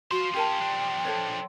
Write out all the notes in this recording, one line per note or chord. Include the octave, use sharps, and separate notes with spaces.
F4 F#4 C5 C6
C#4 F4 G4 A#4 G5 A5
F3 D4
A4 C5 C#5